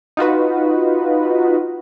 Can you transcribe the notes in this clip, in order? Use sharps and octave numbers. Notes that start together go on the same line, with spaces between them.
D#4 F4 F#4 B4